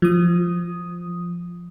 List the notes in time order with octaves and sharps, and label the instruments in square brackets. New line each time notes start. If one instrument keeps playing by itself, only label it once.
[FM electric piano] F3 D#6